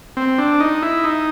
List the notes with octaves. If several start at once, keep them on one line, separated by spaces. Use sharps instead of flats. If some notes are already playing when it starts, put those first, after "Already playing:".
C4
D4
D#4
E4
D#4